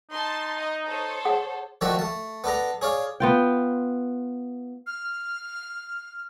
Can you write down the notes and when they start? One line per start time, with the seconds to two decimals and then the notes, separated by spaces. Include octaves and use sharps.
0.11 D#4 A5 C6
0.59 D#5
0.88 A4 C5 C#5
1.25 G#4 F#5 D#6
1.81 D#3 F3 A3 D4 F#4 E5
1.99 A3 A5
2.44 B3 D4 A4 A#5
2.82 G#4 C#5 D5 F5
3.20 B3 F4 G5
4.86 F6